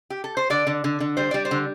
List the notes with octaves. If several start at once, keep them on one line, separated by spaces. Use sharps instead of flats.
G4
A4
C5
D3 D5
D3
D3
D3
G3 C5
G3 D5
C5
D3